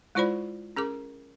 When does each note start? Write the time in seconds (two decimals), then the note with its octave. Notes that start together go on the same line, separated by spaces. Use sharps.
0.15 G#3 E4 F4 C5 D5 B5
0.76 C#4 G#4 A#4 D6